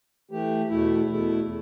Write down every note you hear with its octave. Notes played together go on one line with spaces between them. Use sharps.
E3 A3 G4
E2 B2 A3 E4
E2 B2 A3 E4